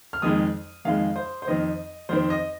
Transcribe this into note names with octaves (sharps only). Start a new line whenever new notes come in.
F6
F2 D#3 G#3 D#6
F2 D#3 G#3 F5
C5
C5
F2 D#3 C4 D#5
F2 D#3 C4 C5
D#5